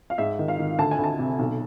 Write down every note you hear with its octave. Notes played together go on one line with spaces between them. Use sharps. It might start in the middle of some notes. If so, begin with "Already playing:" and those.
F5
G#2 E5
D#3
F5
D#3
D2 A5
G#5
D2 A5
C3
B1